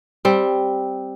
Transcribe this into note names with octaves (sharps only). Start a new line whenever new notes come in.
G3 C4